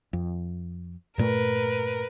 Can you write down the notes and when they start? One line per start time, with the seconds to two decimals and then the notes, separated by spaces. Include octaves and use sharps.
0.13 F2
1.18 G2 A#2 A3 A#4 B4